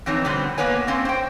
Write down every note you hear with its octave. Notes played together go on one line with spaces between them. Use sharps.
F2 E3 C4 D#4 C#5
B2 D3 F#3 G3 B3 C4
A#3 B3 B4 C#5 G#5
A#3 C4 C#4
C5 G5